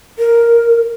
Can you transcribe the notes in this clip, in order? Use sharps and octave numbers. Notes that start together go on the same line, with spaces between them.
A#4